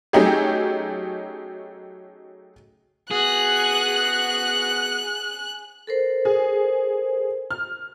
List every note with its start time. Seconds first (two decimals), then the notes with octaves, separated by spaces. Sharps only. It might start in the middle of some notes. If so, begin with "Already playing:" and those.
0.13 F#3 A3 C#4 D#4 G4 G#4
3.11 B3 F#4 G#4 F#5 F#6
5.87 A4 A#4 C5
6.25 G#4
7.51 F6